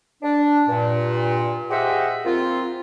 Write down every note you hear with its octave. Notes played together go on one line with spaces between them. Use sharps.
D4
G2 A#2
G4 G#4 C5 D#5 E5 F#5
A#3 C4 F4